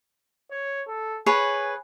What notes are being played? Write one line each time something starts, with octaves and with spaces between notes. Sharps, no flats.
C#5
A4
G#4 B4 C#5 G#5